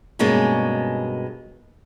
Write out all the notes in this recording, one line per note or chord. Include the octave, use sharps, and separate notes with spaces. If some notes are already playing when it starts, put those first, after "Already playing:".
G2 B2 G#3 A#3 B3 C#4